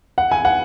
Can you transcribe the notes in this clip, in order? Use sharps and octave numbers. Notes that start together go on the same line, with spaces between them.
F#5
G#5
F#5